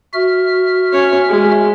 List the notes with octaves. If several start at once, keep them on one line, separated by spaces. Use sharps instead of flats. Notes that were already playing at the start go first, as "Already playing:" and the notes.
F#4 E5 F6
C#4 C#5
G#3